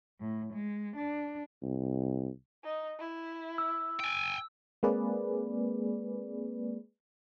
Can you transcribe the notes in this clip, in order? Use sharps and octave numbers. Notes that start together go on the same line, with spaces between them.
A2
G#3
D4
C2
D#4
E4
E6
G5 G#5
G#3 A#3 C4 G#4 B4 D5